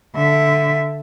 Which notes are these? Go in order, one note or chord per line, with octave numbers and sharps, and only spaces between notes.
D3 E5